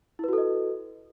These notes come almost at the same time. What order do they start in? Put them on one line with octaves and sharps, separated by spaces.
E4 B4 F#4 A4 D#5